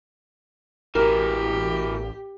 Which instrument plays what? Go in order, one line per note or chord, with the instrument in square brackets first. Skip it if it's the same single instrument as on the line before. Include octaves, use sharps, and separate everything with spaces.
[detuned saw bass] A1 [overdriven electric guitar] B2 E3 [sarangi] G4 [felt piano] A#4